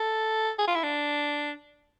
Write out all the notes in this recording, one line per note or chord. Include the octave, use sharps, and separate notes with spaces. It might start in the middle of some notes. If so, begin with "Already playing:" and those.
Already playing: A4
G#4
F4
E4
D4